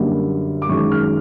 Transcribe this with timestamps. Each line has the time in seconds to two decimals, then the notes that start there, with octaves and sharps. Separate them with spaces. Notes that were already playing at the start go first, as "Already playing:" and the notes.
Already playing: F#2 D3 G3 A#3
0.62 D6
0.69 F#2 D#3 G#3 C#6
0.92 F6